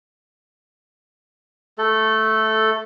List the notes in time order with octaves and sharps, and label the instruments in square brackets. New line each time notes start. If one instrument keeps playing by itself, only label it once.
[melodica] A3 A4